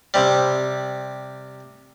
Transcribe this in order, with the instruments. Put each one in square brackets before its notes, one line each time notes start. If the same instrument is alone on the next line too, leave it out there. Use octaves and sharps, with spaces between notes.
[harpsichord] C3 G3